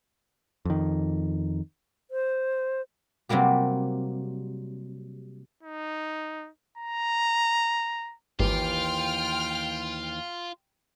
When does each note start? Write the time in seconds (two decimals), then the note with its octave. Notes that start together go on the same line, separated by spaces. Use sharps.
0.65 F2 D#3
2.11 C5
3.29 C3 F#3 G3 A#3 G4
5.63 D#4
6.78 A#5
8.40 G#1 D#2 E3 F4 G4 G5 F6